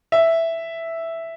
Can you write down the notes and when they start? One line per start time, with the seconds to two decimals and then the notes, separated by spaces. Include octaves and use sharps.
0.12 E5